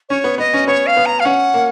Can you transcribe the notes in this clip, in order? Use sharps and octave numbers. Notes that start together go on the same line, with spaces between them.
C#4 C#5
B3
B3 D#5
C#4
B3 C#5
F5
B3
A#5
F5
C#4 F#5
A#3